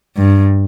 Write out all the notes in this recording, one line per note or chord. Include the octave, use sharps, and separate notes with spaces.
G2